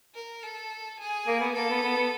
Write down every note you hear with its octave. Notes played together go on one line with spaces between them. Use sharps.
A#4
A4
G#4
A#3
B3
A#3 A4
B3
B3
B3